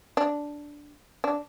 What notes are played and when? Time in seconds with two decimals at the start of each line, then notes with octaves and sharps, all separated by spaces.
0.17 D4
1.24 D4